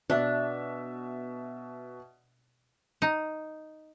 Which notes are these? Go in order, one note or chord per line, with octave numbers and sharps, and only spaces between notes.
B2 D4 E5
D#4